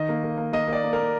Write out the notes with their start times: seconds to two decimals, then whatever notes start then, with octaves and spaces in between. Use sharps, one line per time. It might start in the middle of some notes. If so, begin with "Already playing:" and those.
Already playing: D#3 D#5
0.09 A#3
0.24 A#3
0.37 A#3
0.53 A#3 D#5
0.68 A#3 D5
0.83 A#3
0.93 A#4
0.98 A#3